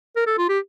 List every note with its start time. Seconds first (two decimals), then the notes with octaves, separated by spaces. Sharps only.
0.16 A#4
0.26 A4
0.38 F4
0.49 G4